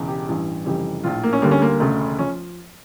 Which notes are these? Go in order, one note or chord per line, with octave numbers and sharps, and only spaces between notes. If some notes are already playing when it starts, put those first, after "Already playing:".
Already playing: E1 E2 C#3
G4
A1 G2 E3 G3
F1 F2 C#3 E3 G3 G4
A#1 A2 F3 F4
A#3
C#4
D2 D3 G3 A#3
C#4
A#3
E1 D2 C#3 A3
F3 C#4